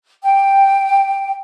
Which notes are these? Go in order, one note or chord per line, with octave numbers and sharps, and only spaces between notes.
G5